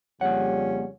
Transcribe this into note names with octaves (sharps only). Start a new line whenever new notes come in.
F2 A#2 C#3 G3 C#4 F#5